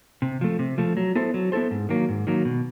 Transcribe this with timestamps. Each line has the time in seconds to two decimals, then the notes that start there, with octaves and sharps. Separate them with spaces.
0.22 C3
0.41 F3 A3
0.59 C3
0.78 F3 A3
0.97 F#3
1.15 B3 E4 A4 C5
1.34 F#3
1.52 B3 E4 A4 C5
1.71 G#2
1.89 D#3 F#3 A#3
2.09 G#2
2.27 D#3 F#3 A#3
2.45 B2